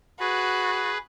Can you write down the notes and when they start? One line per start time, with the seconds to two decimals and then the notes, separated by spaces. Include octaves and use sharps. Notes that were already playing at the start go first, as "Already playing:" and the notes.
0.20 F#4 G#4 B4